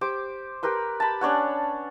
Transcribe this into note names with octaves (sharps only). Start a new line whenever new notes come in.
G4 C5 D6
G4 A#4 B4 C6
A5 B5
C#4 D4 C#5 F#5